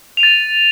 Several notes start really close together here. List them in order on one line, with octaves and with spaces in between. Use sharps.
F7 D#7 A6